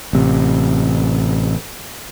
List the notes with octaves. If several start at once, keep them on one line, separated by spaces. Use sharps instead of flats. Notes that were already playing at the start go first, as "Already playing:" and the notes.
A1 C3